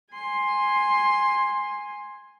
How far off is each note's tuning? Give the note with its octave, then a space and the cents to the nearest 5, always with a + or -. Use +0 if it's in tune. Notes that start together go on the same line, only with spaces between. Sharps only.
G#5 -5 C6 +10